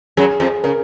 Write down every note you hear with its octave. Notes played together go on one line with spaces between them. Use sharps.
F#2 F#3 G#4
F2 F3
C#3 A#4